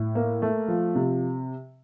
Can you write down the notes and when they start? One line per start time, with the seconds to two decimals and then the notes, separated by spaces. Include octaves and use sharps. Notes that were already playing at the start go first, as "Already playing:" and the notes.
Already playing: A2
0.15 A#3
0.42 A3
0.68 F3
0.95 C3